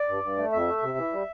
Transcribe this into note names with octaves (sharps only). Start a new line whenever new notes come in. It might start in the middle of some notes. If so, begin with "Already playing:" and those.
Already playing: D5
G2
G2
A3
F2 E5
A3
C3
E3
G3